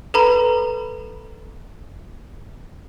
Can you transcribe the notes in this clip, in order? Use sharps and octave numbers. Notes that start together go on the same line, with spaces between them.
A4 B4 A#5 B5